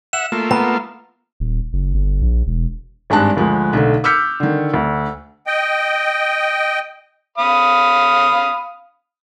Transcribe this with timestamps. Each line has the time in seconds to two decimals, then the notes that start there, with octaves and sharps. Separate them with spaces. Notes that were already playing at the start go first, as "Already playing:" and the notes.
0.13 E5 F#5 E7
0.32 A3 A#3 F4
0.51 B3 A#5
1.40 D#1
1.73 F#1
1.94 G1
2.22 A#1
2.47 E1
3.10 G#1 G2 G#3 D4 A5 F#6
3.37 D2 F3 G#3
3.73 B1 D3 A3
4.04 D6 E6 F6 G6 B6 C#7
4.40 D3 D#3
4.74 D2
5.47 D#5 G5
7.38 F5 B5 D#6